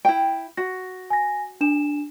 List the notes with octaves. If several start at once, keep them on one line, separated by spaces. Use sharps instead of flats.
E4 G5
F#4 A#6
G#5 A#6
D4 G#5 E7